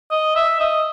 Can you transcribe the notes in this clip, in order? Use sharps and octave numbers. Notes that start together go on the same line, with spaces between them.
D#5
E5
D#5